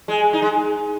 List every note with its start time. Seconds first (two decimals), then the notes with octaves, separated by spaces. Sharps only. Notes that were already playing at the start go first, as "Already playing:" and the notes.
0.08 G#3
0.33 D#4
0.42 G#3